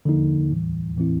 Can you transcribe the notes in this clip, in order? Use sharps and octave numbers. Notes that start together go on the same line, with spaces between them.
D3 F3 A#3 D#4
A2 E3 G3
A2 E3 A3 C4 E4